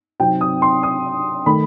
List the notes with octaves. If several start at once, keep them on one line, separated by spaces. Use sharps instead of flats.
C3 F#3 C4 D#4 G5
D#6
C6
D#6
D#3 A3 B5